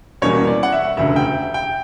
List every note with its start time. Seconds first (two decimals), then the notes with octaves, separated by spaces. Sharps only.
0.22 E2 B2 G3 A#3 C#4 C#5
0.47 D5
0.63 F#5
0.72 E5
0.97 E1 D2 C#3 E5
1.16 G5
1.54 G5